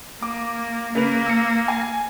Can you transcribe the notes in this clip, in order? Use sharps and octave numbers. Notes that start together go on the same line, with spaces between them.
A#3 D6
C#3 A#3 B4 F7
E6 C#7
G#5